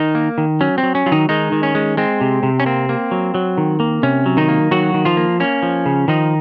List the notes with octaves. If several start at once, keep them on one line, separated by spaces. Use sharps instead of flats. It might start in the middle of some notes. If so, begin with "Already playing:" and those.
Already playing: D#3 D#4
A#3
D#3
F#3 C#4
C4
F#3
C#4
F#3 F4
D#3 D#4
D#3 G#3 D#4
D#3
C#4
G#3
G#3 C4
C3
C3
C#4
A#3 C4
A#3
F#3
F#3
D#3
A#3
C3 C#4
F#3
D#3 D#4
A#3
D#3 F#3 F#4
D#3
F3 F4
A#3
A#3 C#4
F3
C#3
D#3 F3 D#4